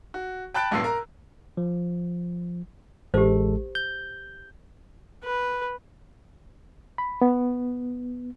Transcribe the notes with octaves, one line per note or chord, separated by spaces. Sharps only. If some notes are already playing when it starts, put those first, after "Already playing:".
F#4
G5 A5 B5 F#6 A6 D7
A#1 G2 A#2 B3 E6 C7
A#4 A#5
F3
A1 G#3 G4 A4 C5
G6
B4
B5
B3